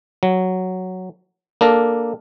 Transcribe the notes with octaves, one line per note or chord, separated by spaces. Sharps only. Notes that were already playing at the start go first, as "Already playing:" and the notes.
F#3
A#3 D4 A4 A#4